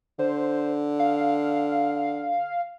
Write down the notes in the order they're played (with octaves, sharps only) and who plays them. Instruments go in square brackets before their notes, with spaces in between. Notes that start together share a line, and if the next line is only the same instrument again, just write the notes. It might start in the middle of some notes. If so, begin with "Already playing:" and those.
[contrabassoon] D3 [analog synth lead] C5
[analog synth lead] F5